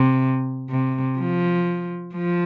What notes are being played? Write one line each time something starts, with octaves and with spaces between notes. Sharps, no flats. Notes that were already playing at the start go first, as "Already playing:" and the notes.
Already playing: C3
C3
F3
F3